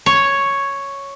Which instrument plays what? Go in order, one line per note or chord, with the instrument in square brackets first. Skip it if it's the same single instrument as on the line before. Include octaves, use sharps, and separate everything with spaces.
[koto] C#5